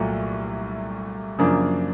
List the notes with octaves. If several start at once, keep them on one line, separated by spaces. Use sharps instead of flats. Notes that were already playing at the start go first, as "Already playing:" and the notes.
Already playing: C2 A#2 F#3 A3
F#2 C#3 F3 A#3 D4